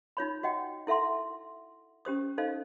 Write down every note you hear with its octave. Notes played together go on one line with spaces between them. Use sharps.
D#4 F4 C#5 B5
F#4 D#5 F#5 G5
E4 A4 E5 F#5 C6
C#4 G4 C5 D#6
D#4 A4 C5 D#5 F5